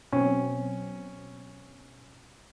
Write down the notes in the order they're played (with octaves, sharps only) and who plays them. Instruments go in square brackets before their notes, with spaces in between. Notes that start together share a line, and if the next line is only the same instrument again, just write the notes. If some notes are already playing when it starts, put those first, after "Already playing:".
[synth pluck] B2 F#3 C4 [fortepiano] C#4